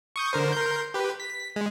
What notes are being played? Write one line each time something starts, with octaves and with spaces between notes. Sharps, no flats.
C#6 D#6 G6
D3 A#4 C5
A#4 C6 G6
G4 B4
B6
G#3